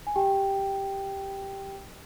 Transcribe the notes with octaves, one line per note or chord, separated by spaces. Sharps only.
G#5
G4 G5